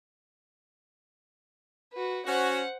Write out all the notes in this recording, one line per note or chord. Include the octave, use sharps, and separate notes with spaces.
F#4 B4
C#4 F#4 C5 F#5